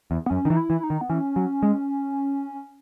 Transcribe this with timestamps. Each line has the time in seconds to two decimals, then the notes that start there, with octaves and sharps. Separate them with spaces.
0.11 E2
0.26 B3
0.30 F#2 C#4
0.45 D#3
0.48 E3 D#4
0.57 E4
0.70 E3
0.83 D#4
0.90 D#3
1.01 B3
1.10 E3 C#4
1.36 F#3
1.63 G#3